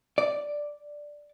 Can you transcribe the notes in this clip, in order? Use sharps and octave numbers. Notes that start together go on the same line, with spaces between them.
D5